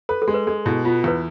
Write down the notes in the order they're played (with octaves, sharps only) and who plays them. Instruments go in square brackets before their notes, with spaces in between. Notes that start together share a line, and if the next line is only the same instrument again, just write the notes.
[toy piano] A4 [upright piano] B4
[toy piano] A4
[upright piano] G#3
[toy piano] B4
[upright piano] G#3 [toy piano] A4
[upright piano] B2 [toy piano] E4
[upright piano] B3 [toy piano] F4
[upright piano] E2 [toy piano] B4